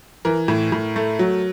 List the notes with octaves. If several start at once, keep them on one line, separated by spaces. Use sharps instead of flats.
E3 A#4
A2
A2
A3
F#3